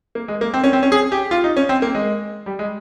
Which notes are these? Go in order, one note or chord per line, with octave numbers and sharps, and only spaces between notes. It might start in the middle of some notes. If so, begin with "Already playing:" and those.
A#3
G#3
A#3
C4
C#4
C4
C#4
G#4
G4
F4
D#4
C#4
C4
A#3
G#3
G3
G#3